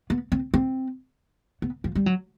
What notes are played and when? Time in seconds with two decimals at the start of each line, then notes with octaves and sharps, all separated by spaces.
0.10 B3
0.32 C4
0.54 C4
1.62 B3
1.84 F3
1.95 G3
2.06 F#3